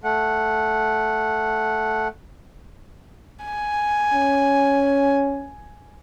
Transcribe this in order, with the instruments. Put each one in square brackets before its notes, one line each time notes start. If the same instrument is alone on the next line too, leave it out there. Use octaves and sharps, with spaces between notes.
[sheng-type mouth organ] A3 F#5
[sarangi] G#5
[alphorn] C#4